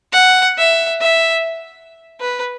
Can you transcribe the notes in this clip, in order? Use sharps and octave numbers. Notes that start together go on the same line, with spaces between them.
F#5
E5
E5
B4